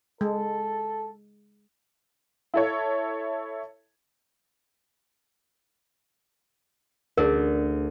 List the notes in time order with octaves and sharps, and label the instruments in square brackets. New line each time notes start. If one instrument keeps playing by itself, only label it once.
[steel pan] G#3 [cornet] A4
[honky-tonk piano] E4 A4 C#5
[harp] D2 D4 [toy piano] G#4 A#4